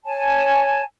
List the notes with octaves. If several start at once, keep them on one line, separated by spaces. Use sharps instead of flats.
C#5 G#5 A5